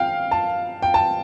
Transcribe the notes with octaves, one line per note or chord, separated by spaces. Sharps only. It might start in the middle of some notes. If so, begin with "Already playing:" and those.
Already playing: F5 G5
A5
G5
A5